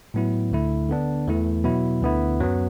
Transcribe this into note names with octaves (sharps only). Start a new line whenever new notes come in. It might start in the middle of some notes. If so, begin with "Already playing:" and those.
A2 F#3 B3 E4
D2 D3 A3 E4
D3 B3 D4
E2 E3 A3 E4
B2 F#3 B3 E4
D2 D3 B3 E4
F#2 F#3 B3